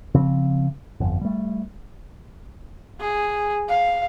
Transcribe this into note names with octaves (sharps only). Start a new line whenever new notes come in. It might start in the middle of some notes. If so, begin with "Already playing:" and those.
C#3 F3 C4
G1 F2
G3 A3
G#4
F5